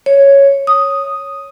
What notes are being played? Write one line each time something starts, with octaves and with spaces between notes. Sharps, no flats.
C#5
D#6